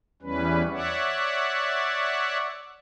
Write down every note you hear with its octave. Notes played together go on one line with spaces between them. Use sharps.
E2 E3 G3 C#4 B4
C#5 D5 E5 F#5